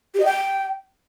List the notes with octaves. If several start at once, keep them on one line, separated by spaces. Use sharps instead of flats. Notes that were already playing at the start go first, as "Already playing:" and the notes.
G4
D#5
G5